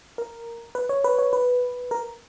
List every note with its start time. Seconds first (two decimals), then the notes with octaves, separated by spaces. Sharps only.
0.18 A#4
0.75 B4
0.89 C#5
1.04 B4
1.19 C#5
1.33 B4
1.91 A#4